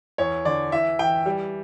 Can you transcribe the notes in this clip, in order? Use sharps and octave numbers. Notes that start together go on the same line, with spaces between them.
E2 C#5
D3 D5
E3 E5
E3 G5
G3